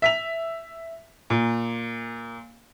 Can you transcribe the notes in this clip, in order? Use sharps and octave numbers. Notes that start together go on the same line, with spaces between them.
E5 B6 F7
A#2